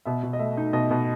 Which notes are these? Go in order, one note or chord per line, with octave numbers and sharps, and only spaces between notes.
B2 E5
B2
D#5
A3 E5
D#4
B2 D#5
B2